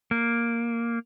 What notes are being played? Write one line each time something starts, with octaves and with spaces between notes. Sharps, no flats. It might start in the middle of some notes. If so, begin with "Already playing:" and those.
A#3